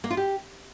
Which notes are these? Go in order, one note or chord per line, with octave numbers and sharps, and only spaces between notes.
A#3
F4
G4